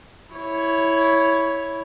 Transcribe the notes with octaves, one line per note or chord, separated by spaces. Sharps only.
E4 C#5